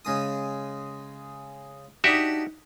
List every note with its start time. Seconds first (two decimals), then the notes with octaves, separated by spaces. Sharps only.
0.05 C#3 G#3 D#6
2.04 D4 D#4 F#4 G4 E5